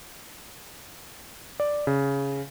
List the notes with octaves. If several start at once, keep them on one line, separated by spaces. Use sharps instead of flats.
D5
C#3